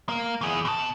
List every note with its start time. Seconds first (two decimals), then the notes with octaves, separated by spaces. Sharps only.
0.09 A#3
0.41 E3 G#4
0.65 B2 A5